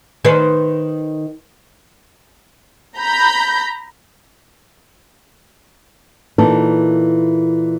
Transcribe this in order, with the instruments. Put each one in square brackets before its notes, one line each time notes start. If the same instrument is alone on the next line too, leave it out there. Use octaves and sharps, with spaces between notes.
[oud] D#3 B4 C5
[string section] A#5 B5 G6
[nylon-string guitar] A#2 E3 D#4 A4